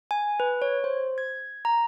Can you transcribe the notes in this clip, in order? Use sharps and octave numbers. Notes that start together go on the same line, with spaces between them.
G#5
B4
C#5
C5
G#6
A#5